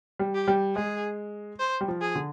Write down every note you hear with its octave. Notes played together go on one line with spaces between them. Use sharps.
G3
G4
G3
G#3 G#4
C5
G3
F3
G#4
D3